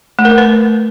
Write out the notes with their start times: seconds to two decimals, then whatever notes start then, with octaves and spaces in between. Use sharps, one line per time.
0.19 A3
0.25 A#4
0.31 A3
0.38 B4